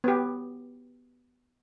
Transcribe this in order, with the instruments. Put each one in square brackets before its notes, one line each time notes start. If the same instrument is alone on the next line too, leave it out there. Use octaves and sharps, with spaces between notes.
[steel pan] B3 G4